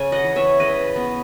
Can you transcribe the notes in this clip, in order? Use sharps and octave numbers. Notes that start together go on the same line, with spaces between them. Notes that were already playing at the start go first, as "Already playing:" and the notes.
Already playing: C#3 G#5
D#5 F#5
E3
C#5 E5
C#3 B4 D#5
B3